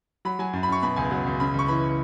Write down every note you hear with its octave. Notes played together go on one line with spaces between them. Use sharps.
F#3 B5
F#3 G#5
F#2
B5
F#2 C#6
B2 B5
C#2 G#5
F#3
C#2
C#3 B5
C#2
C#6
E3 B5